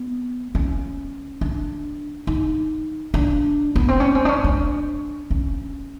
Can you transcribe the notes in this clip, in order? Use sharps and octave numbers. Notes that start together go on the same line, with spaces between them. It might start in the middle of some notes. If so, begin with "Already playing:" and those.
Already playing: B3
C#4
D4
D#4
D4
B3
C4
C#4
C4
D4
C#4
D4
C#4